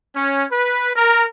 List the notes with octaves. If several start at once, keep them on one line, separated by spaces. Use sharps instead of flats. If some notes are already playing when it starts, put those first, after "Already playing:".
C#4
B4
A#4